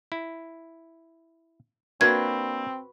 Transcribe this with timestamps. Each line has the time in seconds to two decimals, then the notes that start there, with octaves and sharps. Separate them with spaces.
0.12 E4
2.01 A#3 C4 D4 F#4 B4 G#6